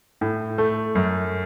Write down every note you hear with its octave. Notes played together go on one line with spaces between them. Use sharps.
A2
A3
F#2